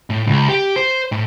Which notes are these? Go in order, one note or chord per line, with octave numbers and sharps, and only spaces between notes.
A2
C#2
G4
C5
A2